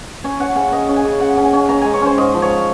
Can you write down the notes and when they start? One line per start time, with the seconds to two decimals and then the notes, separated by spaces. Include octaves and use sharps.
0.24 C#4 G#5
0.39 C#4 F#5
0.55 C#3 G#5
0.72 C#4 D#5
0.88 C#4
0.96 G#5
1.04 C#3
1.20 C#3 F#5
1.37 C#4
1.45 G#5
1.53 C#4
1.69 C#4 A#5
1.81 G#3 G#5
1.93 C#5
2.01 C#4 C5
2.18 G#2 D#5
2.34 F3
2.42 C#5